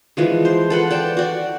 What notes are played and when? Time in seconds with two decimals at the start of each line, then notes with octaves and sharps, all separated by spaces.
0.17 E3 F3 G#3
0.45 C5
0.70 A4 B4 F#5
0.90 D5 G5 A5
1.17 F#4 D5